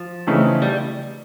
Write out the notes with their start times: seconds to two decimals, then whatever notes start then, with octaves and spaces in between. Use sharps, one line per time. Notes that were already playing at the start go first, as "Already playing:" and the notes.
Already playing: F3
0.27 C#3 E3 A3 C4 D#4
0.62 G3